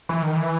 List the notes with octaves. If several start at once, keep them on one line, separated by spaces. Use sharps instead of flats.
E3
D#3
E3